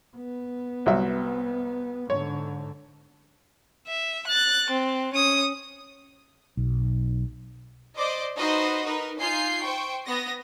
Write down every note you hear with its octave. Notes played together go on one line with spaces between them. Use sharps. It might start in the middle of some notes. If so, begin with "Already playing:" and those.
B3
C2 F#3 E5
G#2 D3 C#5
E5
F#6 A6
C4
C#4 D#6
B1
C5 D5 D#5 D6
D#4 F#4 B4 C5 D#5
D#4 A#4 B4
D#4 F4 G#5 G6 C7
C5 G5 C#6
B3 D#6 A#6